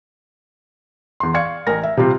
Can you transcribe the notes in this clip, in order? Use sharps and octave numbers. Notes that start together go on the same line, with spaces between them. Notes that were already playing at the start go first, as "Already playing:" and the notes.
E2 C6
D5 F5 C#6 G#6 C#7
A1 A#4 G#5 A#6
E5
C3 G3 F4 G4